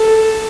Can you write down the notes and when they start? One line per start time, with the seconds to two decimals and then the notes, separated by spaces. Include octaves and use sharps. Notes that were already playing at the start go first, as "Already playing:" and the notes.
Already playing: A4